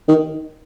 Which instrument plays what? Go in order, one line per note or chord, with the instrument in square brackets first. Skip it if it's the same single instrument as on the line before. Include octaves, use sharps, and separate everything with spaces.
[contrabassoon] D#3